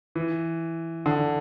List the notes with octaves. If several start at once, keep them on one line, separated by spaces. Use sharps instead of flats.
E3
D3